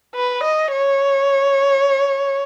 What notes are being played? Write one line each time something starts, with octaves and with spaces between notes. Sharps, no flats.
B4
D#5
C#5